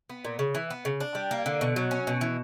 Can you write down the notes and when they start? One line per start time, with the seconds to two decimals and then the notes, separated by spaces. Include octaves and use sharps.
0.09 B3
0.25 A#2
0.39 C#3
0.55 E3
0.70 B3
0.85 C#3
1.00 D4
1.15 G3
1.31 A#3
1.46 D3
1.61 B2
1.76 F#3
1.91 C#4
2.07 B2
2.21 E3